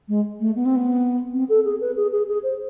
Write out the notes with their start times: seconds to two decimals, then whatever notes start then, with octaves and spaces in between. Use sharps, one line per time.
0.08 G#3
0.40 A3
0.56 B3
0.66 C4
0.76 B3
1.33 C4
1.49 A4
1.65 G#4
1.81 B4
1.96 G#4
2.12 G#4
2.28 G#4
2.43 C5